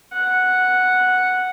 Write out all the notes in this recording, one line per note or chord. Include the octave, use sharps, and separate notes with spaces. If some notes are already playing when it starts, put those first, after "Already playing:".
F#5